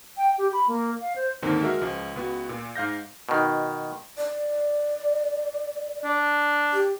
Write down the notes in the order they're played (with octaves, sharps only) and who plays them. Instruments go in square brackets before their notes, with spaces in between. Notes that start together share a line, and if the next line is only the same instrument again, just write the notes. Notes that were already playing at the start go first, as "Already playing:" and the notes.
[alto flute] G5
G4
B5
A#3
F5
C5
[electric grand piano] D#2 G#2 D3 D#3 A#3 C4
G#3 F#4 A#4 E5
C#2 F3
C#2 B3 F#4
A#2
G#2 F5 G6 A#6
[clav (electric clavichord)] B2 D#3
[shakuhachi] D5
[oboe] D4
[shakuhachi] G4